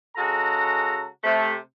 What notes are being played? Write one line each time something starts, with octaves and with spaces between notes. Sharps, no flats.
C#3 G#3 F#4 A4 A#5
C3 A3